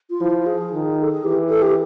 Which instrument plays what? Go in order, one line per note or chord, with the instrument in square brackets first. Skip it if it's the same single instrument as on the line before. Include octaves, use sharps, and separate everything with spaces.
[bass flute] F4
[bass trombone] F3 [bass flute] E4
[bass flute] G#4
[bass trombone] D#3
[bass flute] A4
G#4
[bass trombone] E3 [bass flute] G4
[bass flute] A4
G4